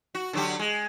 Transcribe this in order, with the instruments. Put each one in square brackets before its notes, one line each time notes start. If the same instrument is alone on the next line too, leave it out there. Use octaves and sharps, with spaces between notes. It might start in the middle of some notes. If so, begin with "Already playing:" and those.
[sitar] F#4
D3 F#3 G4
G#3